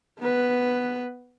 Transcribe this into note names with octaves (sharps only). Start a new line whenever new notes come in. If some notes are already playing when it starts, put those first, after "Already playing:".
B3 B4